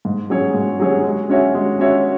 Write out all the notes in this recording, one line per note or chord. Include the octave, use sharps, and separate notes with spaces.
G#2
F#3 C#4 G#4 C#5
G#2
F#3 C#4 G#4 C#5
G#3
C#4 F#4 C#5 E5
G#3
C#4 F#4 C#5 E5